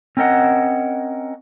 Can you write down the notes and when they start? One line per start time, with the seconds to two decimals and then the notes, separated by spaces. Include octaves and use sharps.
0.17 C4 C#4 A#4 D#5 F#5